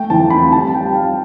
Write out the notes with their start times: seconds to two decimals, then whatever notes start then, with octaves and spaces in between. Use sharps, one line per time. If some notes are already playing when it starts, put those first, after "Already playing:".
Already playing: A3 G5
0.10 E3 A5
0.30 F2 B5
0.52 G3 A5
0.74 G3 G5
0.95 G3 F5